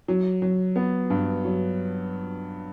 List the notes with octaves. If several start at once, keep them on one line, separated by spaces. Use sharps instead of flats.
F#3
F#3
B3
G2
F#3